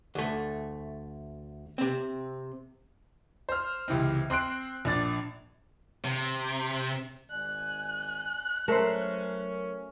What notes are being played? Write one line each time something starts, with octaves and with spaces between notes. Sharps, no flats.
D2 A3
C3 C4
C5 F6
C#2 C3 E3 C4
C4 C6 F#6 D7
A#1 D4 A6
C3
G#1 D5 G#5 F#6
F#3 A3 C#4 A#4 C5